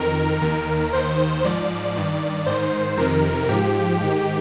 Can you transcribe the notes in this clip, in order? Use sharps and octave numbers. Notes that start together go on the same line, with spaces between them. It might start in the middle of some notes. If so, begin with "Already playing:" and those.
Already playing: F2 D#3 A#4
D#2 D#3
D#2 D#3 C5
G#2 F3 D5
G2 D#3
G#2 D#3 C5
F2 C3 D#3 A#4
G#2 F3 G4
G#2 D#3